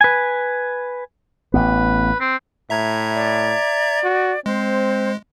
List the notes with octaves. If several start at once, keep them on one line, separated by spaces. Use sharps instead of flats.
B4 G#5
A1 B3 B4
C4
A2 E5 A#5 G#6
D5
F#4
G#3 C4 C5